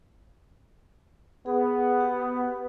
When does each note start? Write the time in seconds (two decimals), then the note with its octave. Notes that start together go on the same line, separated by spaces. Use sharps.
1.46 B3 G#4
2.00 G4